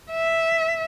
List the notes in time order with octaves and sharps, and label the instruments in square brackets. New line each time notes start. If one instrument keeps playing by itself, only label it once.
[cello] E5